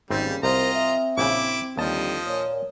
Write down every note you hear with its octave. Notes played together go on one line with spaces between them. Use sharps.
G#1 D#2 G#2 C#3 G3 C4
C2 C4 F4 A#4 C5 D#5 A#5
E5
A#1 C#3 E4 D6
D#2 D3 F3 G3 D#4 D#5 A5
A#2 C#5